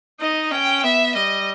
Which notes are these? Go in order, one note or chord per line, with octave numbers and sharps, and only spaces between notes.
D#4 D#5
C#4 G5
B3 E5
G3 D#5